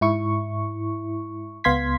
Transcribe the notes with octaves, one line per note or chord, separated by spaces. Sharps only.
G#2 E4 C#6
C#2 B3 F5 C6 G#6 B6